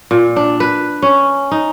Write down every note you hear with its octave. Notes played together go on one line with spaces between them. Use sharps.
A#2
D4
B4
C#4
D#4